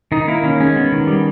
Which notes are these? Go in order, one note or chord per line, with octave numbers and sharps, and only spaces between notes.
D#3 D#4
A#3 E4
D#3 C#4
G#3 C#4
B3
D#3
G3